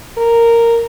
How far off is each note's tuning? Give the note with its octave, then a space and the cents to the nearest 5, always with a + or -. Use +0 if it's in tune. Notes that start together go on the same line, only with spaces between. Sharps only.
A#4 -10